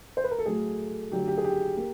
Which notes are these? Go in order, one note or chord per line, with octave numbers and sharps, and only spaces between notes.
C5
B4
A#4
A4
A2 F#3 A3 G#4
D3 F#3 A3 G4
G4
G#4
G4
A#3